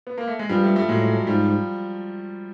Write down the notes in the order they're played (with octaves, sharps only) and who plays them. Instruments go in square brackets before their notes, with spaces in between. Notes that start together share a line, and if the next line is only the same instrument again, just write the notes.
[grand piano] B3
A#3
A3
G#3
[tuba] G2 [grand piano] F3 G3
[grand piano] G3 A3
G3 A3
[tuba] A2 [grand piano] F#3 G#3
[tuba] G#2 [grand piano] F3 G3